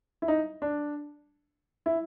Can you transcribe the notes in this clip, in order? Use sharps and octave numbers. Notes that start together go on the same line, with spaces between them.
E4
D#4
D4
E4